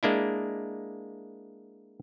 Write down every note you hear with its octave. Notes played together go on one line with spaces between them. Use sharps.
G#3 A#3 D4 E4